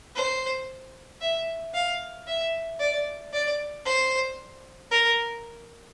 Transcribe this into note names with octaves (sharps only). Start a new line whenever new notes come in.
C5
E5
F5
E5
D5
D5
C5
A#4